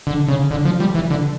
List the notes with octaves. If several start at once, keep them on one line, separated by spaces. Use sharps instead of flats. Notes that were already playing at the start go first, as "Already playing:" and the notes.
D3
C#3
D3
F3
G3
E3
D3